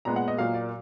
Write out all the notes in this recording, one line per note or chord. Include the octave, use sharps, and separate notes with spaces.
A#2 G#3 B3 A#5
F#5
D#5
A#2 F#3 A#3 F5
D5